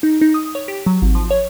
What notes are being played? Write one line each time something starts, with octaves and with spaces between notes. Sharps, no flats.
D#4
D#4
D#6
C#5
G4
F#3
G#1
F3
C#5